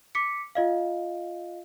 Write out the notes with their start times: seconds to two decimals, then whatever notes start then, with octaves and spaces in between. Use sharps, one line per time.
0.15 D6 B6 C#7
0.55 F4 D#5 F5